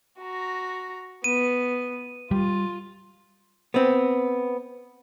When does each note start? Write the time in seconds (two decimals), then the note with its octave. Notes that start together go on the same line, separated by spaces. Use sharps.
0.21 F#4 A#5
1.24 B3 D#7
2.31 G3 F4
3.74 B3 C4